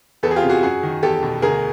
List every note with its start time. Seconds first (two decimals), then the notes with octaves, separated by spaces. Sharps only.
0.23 E2 A4 B4
0.31 G#4
0.36 F4 G4
0.43 C3
0.49 F#4 G#4
0.63 F#2 F#4 G#4
0.83 D#3
1.03 E2 G4 A4
1.23 B2
1.42 D2 G#4 A#4